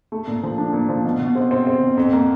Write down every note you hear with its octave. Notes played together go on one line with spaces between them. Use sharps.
A3
A#2
F3
D4
A#2
F3
B2
B2
C4
C4
C4
B2
F2
A#3